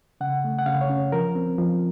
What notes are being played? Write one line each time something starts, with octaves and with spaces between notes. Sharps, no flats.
C#3 F#5
A3
F#5
C#3 F5
C#5
C#4
F3 A#4
C4
F3